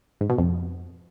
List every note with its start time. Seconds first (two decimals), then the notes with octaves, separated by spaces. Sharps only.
0.21 G#2
0.30 B2
0.38 F2